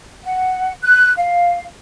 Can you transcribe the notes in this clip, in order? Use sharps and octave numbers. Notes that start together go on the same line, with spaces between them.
F#5
F#6
F5